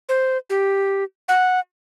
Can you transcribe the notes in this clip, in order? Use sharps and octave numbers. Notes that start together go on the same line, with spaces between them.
C5
G4
F#5